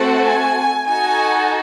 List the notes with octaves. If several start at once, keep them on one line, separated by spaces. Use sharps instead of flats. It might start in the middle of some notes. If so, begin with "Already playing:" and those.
Already playing: A3 C4 F#4 A4 F#5
G#5
D#4 F#4 A4 G#5